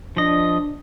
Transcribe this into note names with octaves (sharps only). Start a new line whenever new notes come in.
F3 D4 D#5